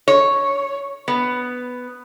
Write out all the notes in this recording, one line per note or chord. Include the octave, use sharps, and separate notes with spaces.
C#5
B3